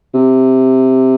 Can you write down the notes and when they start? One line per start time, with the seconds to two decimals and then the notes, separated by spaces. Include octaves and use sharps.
0.14 C3